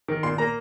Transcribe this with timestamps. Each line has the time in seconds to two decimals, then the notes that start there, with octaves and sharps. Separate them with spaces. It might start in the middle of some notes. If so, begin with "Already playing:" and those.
0.08 D#3
0.23 A#2 C6
0.38 A#3 A#5